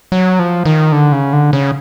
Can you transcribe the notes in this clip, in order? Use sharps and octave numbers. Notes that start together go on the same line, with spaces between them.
F#3
F3
D#3
D3
C#3
D3
C#3